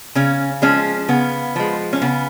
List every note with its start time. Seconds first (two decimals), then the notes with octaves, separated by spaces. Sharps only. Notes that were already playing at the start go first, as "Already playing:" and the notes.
0.15 C#3 C#4
0.62 F3 G#3 C#4
1.08 C#3 B3
1.56 F3 G#3
1.93 C#4
2.02 C#3 B3